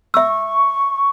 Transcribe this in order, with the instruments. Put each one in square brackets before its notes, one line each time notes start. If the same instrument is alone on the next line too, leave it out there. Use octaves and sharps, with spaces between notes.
[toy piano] E5 E6 [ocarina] C#6